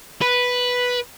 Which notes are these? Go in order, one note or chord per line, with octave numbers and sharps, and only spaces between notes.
B4